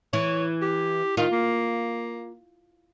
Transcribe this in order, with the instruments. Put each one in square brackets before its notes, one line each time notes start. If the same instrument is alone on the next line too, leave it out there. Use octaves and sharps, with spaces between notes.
[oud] E3 [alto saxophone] C#5
[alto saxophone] G4
[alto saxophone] D#3 [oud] F4
[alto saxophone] A#3